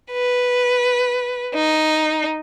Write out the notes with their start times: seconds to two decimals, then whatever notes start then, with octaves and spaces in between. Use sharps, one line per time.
0.12 B4
1.55 D#4